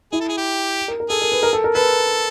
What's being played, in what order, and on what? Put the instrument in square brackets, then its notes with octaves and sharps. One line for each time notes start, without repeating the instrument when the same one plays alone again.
[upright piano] E4 [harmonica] G#4
[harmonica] A4
G#4
G4
[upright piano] A#4
A#4
[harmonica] G#4 [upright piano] A4
[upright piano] A#4
B4
A#4
A4
A#4
[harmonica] A4 [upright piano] B4